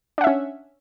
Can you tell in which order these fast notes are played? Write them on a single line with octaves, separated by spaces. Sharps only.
D4 F#5 E5 C#4